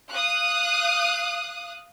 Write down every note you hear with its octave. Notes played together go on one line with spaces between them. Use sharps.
F5 D#6 F#6